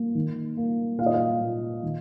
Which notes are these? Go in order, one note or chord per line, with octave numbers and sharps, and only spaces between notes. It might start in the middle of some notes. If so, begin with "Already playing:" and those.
Already playing: A#3
D#3
A#3
A#2 F5
D#5
F5
A#2
D#3